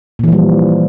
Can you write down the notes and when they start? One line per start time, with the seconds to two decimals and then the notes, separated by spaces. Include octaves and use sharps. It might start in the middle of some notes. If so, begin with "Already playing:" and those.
0.19 A#2
0.24 E3
0.28 F3
0.32 G3